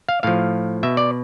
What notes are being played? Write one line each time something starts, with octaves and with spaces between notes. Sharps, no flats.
F5
A2 F3 F5
B2 E5
D5